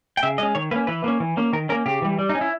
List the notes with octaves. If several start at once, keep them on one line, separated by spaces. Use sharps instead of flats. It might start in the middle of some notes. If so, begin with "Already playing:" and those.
G5
C#3 E5
G#3 C#4 D#5
D#3 C#5
A#3 C#4 B4
E3 B4
A#3 C#4
E3
A#3 C#4
D#3 A#4
A#3 C#4 A#4
C#3 G4
E3 G3
G3
D#4
C#4
E4